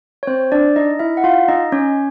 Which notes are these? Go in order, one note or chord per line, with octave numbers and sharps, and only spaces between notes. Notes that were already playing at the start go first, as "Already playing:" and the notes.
C#5
C4 C5
D4 D5
D#4 D#5
E4 E5
F#5
F4 F5
D#4 D#5
C#4 C#5